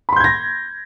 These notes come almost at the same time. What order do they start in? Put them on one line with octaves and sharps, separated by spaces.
B5 C6 G6 G#6 A#6